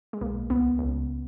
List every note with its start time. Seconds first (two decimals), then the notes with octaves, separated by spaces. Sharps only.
0.13 G#3
0.21 B1 A#3
0.50 C#2 B3
0.79 C#2